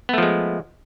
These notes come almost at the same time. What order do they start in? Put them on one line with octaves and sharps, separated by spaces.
B3 A3 F3 G#3